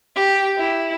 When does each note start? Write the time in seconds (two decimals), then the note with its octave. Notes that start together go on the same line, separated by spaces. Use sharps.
0.16 G4
0.58 E4